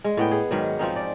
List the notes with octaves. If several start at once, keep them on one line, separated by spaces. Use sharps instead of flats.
G#3
A2 B3 G5
G#4
G#2 D#3 F#3
F3 C4 C#4 D#4
D5